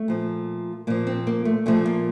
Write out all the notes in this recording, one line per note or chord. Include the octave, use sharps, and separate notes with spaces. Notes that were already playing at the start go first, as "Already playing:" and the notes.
Already playing: A3
A#2 F3
A#2 F3 A#3
C4
A#3
A3
A#2 F3 A3
A#3